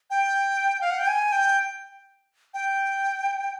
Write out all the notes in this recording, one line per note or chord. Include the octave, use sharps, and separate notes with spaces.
G5
F5
F#5
G5
G#5
G5
G5